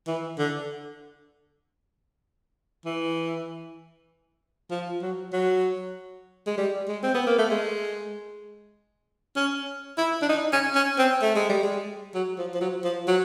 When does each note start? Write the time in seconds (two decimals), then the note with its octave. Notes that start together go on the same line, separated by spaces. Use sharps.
0.07 E3
0.38 D3
2.85 E3
4.71 F3
5.02 F#3
5.33 F#3
6.47 G#3
6.57 G3
6.88 G#3
7.03 C4
7.14 B3
7.27 A#3
7.38 A3
7.50 G#3
9.36 C#4
9.98 E4
10.22 D4
10.29 D#4
10.53 C#4
10.75 C#4
10.99 C4
11.22 A3
11.36 G#3
11.49 G3
11.63 G#3
12.15 F#3
12.38 F3
12.55 F3
12.61 F#3
12.85 F3
13.08 F#3